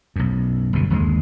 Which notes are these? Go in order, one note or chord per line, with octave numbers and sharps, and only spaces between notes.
B1 F#2
G1 D2 B2
G1 D#2 B2 G#3